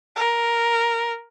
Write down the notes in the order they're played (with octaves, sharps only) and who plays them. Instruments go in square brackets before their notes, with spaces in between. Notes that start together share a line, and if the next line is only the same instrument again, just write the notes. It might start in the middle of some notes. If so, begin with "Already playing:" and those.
[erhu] A#4